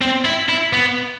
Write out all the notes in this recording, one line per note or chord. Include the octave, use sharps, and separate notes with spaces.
C4
E4
E4
B3